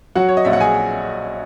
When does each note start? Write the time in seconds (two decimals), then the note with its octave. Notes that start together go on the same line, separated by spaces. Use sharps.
0.15 F#3 F#4 F#5
0.29 C#5
0.37 D#5
0.45 A#1 E5
0.53 F#5
0.61 G#4 G#5